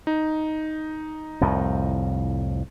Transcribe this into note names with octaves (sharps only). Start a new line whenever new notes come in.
D#4
C2 F2 A2